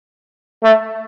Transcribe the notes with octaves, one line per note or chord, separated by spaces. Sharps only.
A3